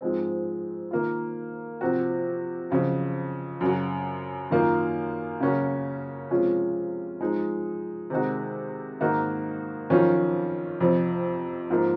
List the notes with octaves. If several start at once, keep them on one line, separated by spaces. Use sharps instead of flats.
G#2 F3 G#3 C4
D#3 A#3 F4
C3 F3 C4 F#4
F2 C#3 F#3
F#2 C#3 F#3
F#2 D#3 A#3 F4
C#3 F#3 A#3 C#4 F#4
C3 F3 G#3 C#4 F4
F3 G#3 D#4
C3 D#3 G#3 D#4 F#4
G#2 D#3 A#3 D#4 F#4
F2 D#3 F#3 C#4 F4
F2 C3 F3
G#2 F3 A#3